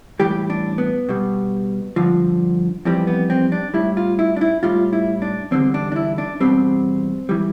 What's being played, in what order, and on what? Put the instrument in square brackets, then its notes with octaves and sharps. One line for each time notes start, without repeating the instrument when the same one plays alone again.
[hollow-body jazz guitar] A2 E3 G3 G4
D4
B3
B2 G3
G2 D3 F3
F2 E3 G3 C4
B3
C4
D4
A2 G3 E4
F4
E4
D4
E4
A2 G3 F4
E4
D4
E2 D3 G3 C4
D4
D4
E4
D4
E2 B2 G3 C4
E3 G3